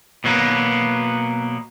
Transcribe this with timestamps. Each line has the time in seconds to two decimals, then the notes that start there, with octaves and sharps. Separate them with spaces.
0.24 B2 F#3 A#3 B3